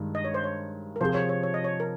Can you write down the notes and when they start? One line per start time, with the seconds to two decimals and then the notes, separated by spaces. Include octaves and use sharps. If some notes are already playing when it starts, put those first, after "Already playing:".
Already playing: G2 D#3 G#3
0.15 D#5
0.25 C#5
0.34 C5
0.44 C#5
0.96 A#4
1.00 C3 F3 C4 F4 G#4 C5
1.14 C#5
1.29 C#5
1.43 C#5
1.54 D#5
1.64 C#5
1.80 A#4